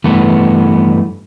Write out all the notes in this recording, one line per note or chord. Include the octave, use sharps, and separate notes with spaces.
G2 E3 A3 B3